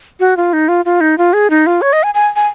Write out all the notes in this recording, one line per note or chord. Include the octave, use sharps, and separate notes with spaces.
F#4
F4
D#4
F4
F4
D#4
F4
G#4
D#4
F4
C#5
D#5
G#5
G#5
G#5